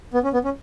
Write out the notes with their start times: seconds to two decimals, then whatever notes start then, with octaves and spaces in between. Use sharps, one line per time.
0.14 B3
0.24 C#4
0.33 B3
0.44 C#4